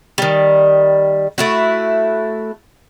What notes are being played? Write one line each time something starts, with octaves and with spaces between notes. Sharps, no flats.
D#3 G3
A3 E4 F#4